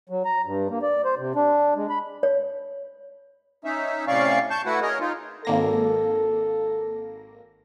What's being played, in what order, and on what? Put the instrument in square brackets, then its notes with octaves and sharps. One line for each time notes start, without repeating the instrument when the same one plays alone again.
[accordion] F#3
A#5
G2
A#3
D5
C5
C3
D4
G#3
B5
[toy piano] C#5
[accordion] C#4 D#4 E5
A2 C3 C#4 D5 F5 C#6
A5 C#6 G6
A3 E4 F#4 B4 F#5
G#4 A#4 C#5 D#5
D#4 F4
[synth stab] G#1 A#3 A#6 [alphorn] A4